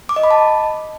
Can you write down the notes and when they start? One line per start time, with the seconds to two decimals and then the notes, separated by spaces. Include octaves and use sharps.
0.09 D6
0.16 D#5
0.23 B5
0.31 A5